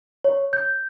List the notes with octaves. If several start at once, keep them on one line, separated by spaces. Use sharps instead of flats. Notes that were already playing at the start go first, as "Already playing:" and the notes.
C#5
G6